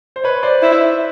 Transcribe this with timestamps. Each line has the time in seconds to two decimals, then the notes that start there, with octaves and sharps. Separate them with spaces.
0.16 C5
0.24 B4 C#5
0.43 C5 D5
0.62 E4